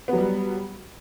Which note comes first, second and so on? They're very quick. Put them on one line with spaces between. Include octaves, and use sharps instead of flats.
B3 F#3 G3